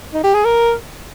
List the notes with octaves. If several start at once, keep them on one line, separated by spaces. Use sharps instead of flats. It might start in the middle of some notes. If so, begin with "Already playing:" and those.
D#4
G4
G#4
A#4